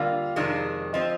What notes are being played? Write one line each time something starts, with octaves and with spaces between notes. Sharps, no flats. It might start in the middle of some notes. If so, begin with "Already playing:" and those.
Already playing: D3 G3 A#3 F4 F5
F2 C3 D#3 G#3 D4
F3 C4 D#5